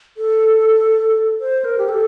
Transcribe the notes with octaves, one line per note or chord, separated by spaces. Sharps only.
A4
C5
A#4
G4
A4